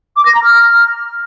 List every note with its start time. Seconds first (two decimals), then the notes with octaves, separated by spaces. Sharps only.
0.16 D6
0.26 A#6
0.35 A#5
0.44 F6